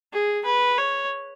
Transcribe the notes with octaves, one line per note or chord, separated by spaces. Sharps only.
G#4
B4
C#5